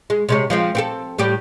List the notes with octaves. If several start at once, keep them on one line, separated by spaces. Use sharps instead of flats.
G#3
C3 G#3 C#4
F3 G#3 C4
C4 G4 A4
A2 G3 G4